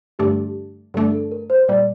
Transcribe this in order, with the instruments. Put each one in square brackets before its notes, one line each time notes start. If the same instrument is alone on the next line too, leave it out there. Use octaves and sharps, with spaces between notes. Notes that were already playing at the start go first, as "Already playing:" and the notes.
[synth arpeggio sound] G2 D3 A3 D4 [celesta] G4
[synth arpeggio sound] G2 D3 A3 D4 [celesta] A4
[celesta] A4
A#4
C5
[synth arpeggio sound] A#2 G3 A#3 [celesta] D5